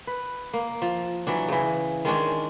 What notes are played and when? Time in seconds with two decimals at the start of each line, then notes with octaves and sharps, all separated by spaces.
0.07 B4
0.53 A#3
0.82 F3
1.27 E3 F#3 D4
1.48 C#3 E3
2.05 D#3 G#3 C#4 D4